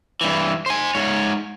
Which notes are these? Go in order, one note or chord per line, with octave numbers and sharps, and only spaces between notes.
G2 E3
C5 G#5
G#2 C#5